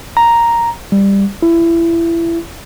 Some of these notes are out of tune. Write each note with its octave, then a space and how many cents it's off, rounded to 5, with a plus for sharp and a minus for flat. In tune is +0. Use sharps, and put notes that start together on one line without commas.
A#5 +0
G3 +15
E4 +25